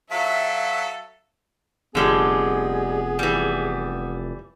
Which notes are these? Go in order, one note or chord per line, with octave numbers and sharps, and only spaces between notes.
F#3 A4 E5 F5 B6
F1 D3 G3 G#3 B3 G#4
E3 G3